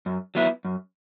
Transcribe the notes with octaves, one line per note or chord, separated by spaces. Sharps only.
F#2
F#3 B3 E4
F#2